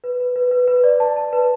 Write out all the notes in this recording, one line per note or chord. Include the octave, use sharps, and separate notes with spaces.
B4
B4
B4
B4
B4
D5
A5
A5
B4